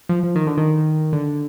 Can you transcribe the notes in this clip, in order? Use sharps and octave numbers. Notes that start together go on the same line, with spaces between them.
F3
F3
D#3
D3
D#3
D3